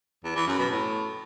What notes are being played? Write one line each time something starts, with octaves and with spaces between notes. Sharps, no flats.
E2
E3
F#2
B2
A2